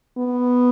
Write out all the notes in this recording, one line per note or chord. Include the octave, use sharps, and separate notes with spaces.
B3